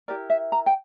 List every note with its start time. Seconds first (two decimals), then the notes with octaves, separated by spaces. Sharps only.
0.08 E4 G4 A#4 D5
0.30 E5
0.52 A#5
0.66 G5